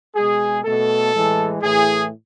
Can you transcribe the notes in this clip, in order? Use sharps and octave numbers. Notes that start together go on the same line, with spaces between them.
B2 G#3 G#4
B2 A3 A4
A2 E3 G#3
A2 E3 A3 G#4